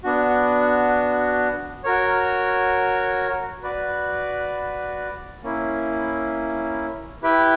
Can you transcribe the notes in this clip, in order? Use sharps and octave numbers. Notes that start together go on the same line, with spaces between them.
B3 D4 F#4
F#4 A#4 C#5
F#4 B4 D5
A#3 C#4 E4
E4 G4 B4 E5 G5